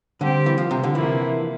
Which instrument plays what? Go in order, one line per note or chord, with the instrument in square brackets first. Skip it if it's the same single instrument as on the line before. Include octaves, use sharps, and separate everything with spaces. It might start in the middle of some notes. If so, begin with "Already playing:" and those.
[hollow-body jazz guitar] D3 [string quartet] G3 C4 G4
[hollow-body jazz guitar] E3
F3
C3
D3
[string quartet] C3 F3 A#3 E4 [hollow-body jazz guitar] E3